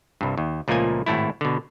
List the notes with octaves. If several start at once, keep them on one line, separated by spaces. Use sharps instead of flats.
C2 G2
D#2
C#2 A#2 F3 A3 A#3 G#5
G#1 A2 A3 E4
B2 D3